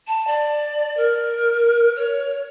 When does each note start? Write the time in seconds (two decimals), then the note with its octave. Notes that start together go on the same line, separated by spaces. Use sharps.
0.07 A5
0.27 D5
0.97 A#4
1.96 C#5